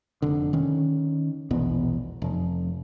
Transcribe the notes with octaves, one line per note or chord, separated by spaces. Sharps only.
F1 D3
D#3 C#4
E1 A#1 E2 B3
F1